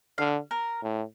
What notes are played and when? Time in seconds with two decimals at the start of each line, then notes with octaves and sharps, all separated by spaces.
0.18 D3 F5
0.51 A#4
0.83 A2